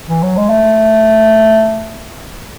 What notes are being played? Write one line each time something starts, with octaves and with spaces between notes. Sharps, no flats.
E3
F#3
G#3
A3